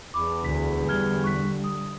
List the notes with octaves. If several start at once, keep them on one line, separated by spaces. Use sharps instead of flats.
E2 B5 D6
D2 B6
D3 G3 F6 G#6 G7
C#6 F#6 B6
D#6